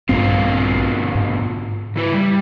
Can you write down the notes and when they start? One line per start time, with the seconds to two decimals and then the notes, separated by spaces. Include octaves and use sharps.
0.09 A#1 G2 B2 D3 C4 F4
1.15 G#2
1.96 C#3 E4 B4
2.14 G3